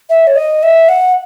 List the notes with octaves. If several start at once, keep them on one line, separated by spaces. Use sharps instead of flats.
E5
C#5
D#5
E5
F#5